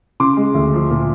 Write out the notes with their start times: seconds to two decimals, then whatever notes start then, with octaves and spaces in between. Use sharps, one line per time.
0.20 C#3 C6 D6
0.37 G#3
0.54 D2
0.73 F3
0.90 A#2